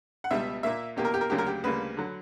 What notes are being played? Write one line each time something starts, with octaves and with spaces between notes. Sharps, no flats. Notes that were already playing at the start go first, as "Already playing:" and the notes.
F#5
C#2 B2 G3 E5
A#2 A#3 E5
E2 B2 A#3 G4
A#4
G4
A#4
D2 C#3 F#3 A#3 G4
A#4
G4
D2 C#3 G3 A#3 B4
D3 F#3